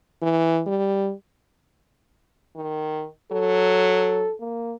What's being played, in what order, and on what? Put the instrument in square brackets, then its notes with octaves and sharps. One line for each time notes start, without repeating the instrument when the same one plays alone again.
[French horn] E3
G3
D#3
[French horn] F#3 [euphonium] A4
[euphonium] A#3